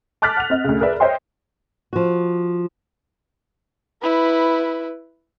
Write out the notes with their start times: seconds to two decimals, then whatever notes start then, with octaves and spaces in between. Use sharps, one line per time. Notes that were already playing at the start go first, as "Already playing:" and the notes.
0.22 A5 D6 F6 F#6 A6 B6
0.37 F#5 F7
0.50 C4 D#5
0.64 D2 C#3
0.80 G#4 A#4 B4 D5 E5
1.00 C5 C#5 D#5 E5 G5 C6
1.93 F3 F#4
4.02 E4 B4